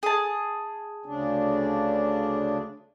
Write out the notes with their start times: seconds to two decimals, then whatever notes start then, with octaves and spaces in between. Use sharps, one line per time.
0.03 G#4 A5
1.06 D2 C#3 D4